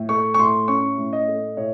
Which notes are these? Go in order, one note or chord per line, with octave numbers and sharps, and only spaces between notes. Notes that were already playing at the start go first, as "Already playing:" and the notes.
Already playing: A2
A3 C#6
C#6
A2 C6
C#4 C#6
A2
D#5
A3
A2 C#5